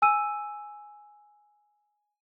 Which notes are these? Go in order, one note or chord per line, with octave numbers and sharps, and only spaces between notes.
G#5 E6 D#7